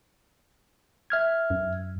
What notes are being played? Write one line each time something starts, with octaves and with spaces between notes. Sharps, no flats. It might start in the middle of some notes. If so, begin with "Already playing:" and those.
E5 F6 G#6
F#2